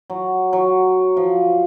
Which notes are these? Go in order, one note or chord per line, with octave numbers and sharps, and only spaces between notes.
F#3
F#3
F3